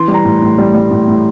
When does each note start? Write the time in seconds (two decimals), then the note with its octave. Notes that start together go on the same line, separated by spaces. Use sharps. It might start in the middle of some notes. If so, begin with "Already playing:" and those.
Already playing: E3 C6
0.08 G3
0.14 A#5
0.25 A2
0.42 A2
0.58 G3
0.75 G3
0.91 A2
1.08 A2